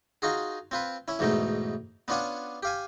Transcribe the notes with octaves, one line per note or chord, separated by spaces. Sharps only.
D#4 F4 F#4 G#4
C4 F4 B4
C#4 E4
E2 G#2 B2 A3 D#4
B3 C#4 D4 F4 F#5 G#5
G4 F5 G#5